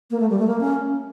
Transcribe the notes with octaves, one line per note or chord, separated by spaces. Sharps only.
A#3
A3
G3
A3
A#3
C#4